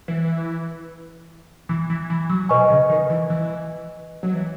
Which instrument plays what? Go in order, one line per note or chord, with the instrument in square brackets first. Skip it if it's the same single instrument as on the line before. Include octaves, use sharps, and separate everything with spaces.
[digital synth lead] E3
E3
E3
E3
F#3
[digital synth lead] B2 [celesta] B4 D#5 G#5 C#6
[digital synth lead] C#3
D#3
E3
E3
F#3
E3